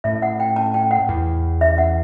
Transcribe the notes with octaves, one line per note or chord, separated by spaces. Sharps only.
A2 E5
F#5
G5
A5
G5
F#5
E2
E5
F#5